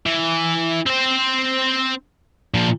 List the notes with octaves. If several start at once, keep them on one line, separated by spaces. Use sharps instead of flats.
E3
C4 C5
A#2 F3